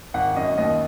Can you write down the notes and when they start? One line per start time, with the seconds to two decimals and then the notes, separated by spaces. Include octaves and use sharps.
0.14 G#1 F#5
0.36 F#2 D#5
0.58 D#2 D#5